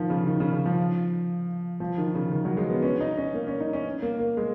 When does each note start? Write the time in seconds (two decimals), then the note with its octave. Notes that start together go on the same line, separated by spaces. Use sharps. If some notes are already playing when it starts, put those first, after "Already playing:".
Already playing: D#3 F3
0.10 C#3
0.27 D#3
0.40 C#3
0.52 C#3
0.65 F3
1.80 F3
1.98 D#3
2.15 C#3
2.32 D#3
2.45 F#3
2.57 G#3
2.70 B3
2.83 C#4
3.01 D#4
3.17 C#4
3.34 A#3
3.47 C#4
3.60 D#4
3.73 C#4
4.02 A#3
4.19 A#3
4.37 G#3